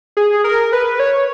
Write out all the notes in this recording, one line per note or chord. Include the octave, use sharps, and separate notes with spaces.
G#4
A#4
B4
C#5